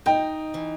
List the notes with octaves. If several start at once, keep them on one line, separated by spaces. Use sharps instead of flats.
D#4 G5
E3